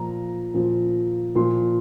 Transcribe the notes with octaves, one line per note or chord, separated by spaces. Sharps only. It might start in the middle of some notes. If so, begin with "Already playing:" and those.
Already playing: A#2 F3 A#5
A#2 F3
A#2 F3 C6